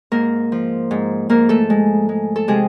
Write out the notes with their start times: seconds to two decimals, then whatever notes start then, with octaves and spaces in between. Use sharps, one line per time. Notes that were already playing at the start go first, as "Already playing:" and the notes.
0.12 G#2 A#3 A#4
0.52 F3
0.91 G#2
1.29 G#2 A#3 A#4
1.49 A3 A4
1.70 G#3
2.09 G#3
2.36 A4
2.48 C3 G#3 G#4